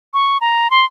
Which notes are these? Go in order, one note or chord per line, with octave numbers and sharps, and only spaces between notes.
C#6
A#5
C6